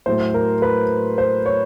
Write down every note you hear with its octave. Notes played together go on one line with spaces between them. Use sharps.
A2 F#3 A3 C5
A#4
B4
C5
C#5